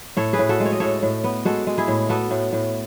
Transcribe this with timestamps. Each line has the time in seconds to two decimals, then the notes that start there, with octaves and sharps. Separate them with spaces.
0.17 A2 A4 C#5
0.33 G#4 B4
0.39 A2
0.49 F#4 A4
0.60 G#3
0.65 C#5
0.72 D#5
0.80 A2 A4 C#5
1.03 A2
1.24 B3
1.45 G#3 F#4 A4
1.67 G#3
1.78 E4 G#4
1.88 A2
2.09 B3 F#4 A4
2.31 A2
2.53 A2